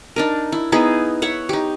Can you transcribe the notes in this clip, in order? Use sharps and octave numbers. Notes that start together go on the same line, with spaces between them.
D4 D#4 A#4
E4
B3 D#4 E4 G#4
C#5 E5 F#5
D#4 G4